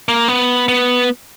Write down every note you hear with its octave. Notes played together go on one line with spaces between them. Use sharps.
A#3
B3
B3